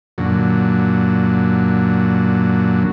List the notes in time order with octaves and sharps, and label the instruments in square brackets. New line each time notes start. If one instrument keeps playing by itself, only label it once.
[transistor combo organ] F#2 A#2 D3 F#3